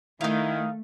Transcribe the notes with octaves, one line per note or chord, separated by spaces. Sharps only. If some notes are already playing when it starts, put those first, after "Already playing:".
D#3 A3 D#4 E4 F5